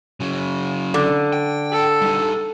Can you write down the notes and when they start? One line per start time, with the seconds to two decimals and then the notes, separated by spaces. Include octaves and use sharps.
0.20 C#3 F#3
0.94 D3
1.33 G5
1.72 A4
2.01 G3 D#4